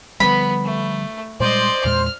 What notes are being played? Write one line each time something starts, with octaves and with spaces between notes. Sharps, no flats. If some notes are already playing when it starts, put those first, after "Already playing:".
D3 F3 G3 B3 B5
A3
A#2 G3 G#3 C5 D5 D#5
E2 A#2 G#3 F6